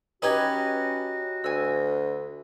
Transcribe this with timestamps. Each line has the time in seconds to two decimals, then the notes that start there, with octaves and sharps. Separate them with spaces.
0.22 C#4 D#4 F#4 G4 B4 G#5
1.44 D2 G#5 E6